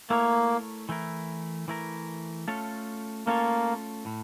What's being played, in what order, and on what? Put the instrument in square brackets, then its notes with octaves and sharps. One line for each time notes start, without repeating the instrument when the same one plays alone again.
[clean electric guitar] A3 E4 A#4 C#5 [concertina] A#3
[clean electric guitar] E3 A3 E4 A#4
E3 A3 E4 A#4
A3 C#4 F4 A4 C#5
[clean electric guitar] A3 C#4 F4 A4 C#5 [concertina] A#3
[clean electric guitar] A2